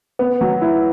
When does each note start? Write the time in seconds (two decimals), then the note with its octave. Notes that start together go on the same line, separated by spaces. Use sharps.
0.19 B3
0.41 F#3
0.62 E4